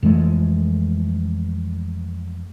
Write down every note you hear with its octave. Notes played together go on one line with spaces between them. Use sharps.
F2 E3 G#3 A3